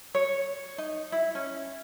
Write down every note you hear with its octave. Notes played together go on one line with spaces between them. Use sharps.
C#5
D#4
E4
C#4